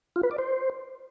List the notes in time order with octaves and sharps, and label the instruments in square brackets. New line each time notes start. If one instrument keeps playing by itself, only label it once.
[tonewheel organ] F4
B4
D5
C5